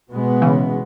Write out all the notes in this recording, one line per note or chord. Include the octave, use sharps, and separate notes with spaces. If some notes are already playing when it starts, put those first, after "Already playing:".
B2 G#3 B3
C#3 E3